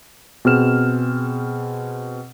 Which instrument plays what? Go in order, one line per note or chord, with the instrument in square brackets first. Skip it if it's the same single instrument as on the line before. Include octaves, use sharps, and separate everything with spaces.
[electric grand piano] B2 C4 G#4 F6 E7